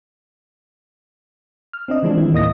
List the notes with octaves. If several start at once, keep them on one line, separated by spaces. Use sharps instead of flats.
F6
C4 D4 D#5
E3 F3 G#3 C4 D4
D#3 E3 G3 E4
D2 A2 A#3 D#5 D#6 A#6